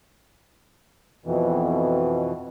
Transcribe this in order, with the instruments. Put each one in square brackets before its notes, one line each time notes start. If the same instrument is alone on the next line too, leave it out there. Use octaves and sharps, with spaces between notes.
[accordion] F2 B2 E3